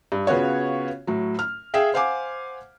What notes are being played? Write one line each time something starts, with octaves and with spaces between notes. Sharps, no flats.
G2
C#3 B3 F4 F#4 C#5
A2 F#3
F6
G#4 E5 F5 G5
C5 F5 F#5 G#5 D6